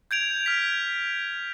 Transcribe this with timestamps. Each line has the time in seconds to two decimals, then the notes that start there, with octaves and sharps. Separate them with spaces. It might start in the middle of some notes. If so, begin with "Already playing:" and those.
0.11 G6 G#6 D7 F7
0.46 F6 B6